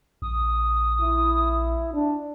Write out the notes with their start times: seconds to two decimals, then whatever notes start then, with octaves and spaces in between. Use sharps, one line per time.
0.22 A#1 D#6
1.01 E4
1.94 D4